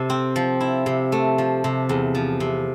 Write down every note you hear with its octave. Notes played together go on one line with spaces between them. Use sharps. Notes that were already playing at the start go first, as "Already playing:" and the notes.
Already playing: C3 A4
C4
F3
E4
C3
A3
F3
C3
E2
F3
C3